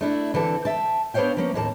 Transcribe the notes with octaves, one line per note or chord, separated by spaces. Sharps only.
A3 D4 E4
D3 E3 C4 A4
E5 G5 A5
B3 D4 C5 C#5 F5 G5
F3 A#3 C#4
D#2 A2 A#3 A5